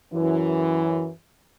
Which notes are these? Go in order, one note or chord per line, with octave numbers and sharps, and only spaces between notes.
F#2 E3